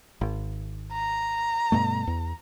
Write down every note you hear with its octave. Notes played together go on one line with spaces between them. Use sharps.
G#1
A#5
G2 B2 A3
E2